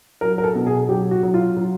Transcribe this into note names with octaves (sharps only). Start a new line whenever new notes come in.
F#3 A#4
A#4
A4
B2
G#4
F#3 G4
F#4
F#3
F4
F#3